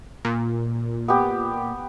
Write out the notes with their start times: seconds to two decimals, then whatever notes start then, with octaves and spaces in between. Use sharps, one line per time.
0.25 A#2
1.08 B3 G4